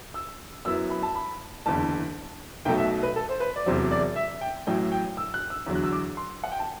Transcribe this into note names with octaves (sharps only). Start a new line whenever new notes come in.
E6
F#2 F#3 B3 E4 E6
B5
A5
B5
F#1 E2 D3 A5
B1 B2 F#3 A3 G5
E5
B4
A4
C5
B4
D5
E1 E2 C3 F#3 C5
D5
E5
G5
A1 A2 F#3 G5
G5
E6
F#6
E6
E2 D3 F#3
F#6
E6
D6
C6
F#5
G5
A5